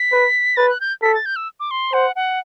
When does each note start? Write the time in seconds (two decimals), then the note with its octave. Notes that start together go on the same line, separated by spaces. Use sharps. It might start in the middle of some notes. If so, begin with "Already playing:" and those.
Already playing: B6
0.12 B4
0.57 B4 A6
0.69 F#6
0.81 G6
1.02 A4 B6
1.14 A6
1.26 G6
1.36 E6
1.60 D6
1.71 C6
1.93 C5 F#5
2.16 F#5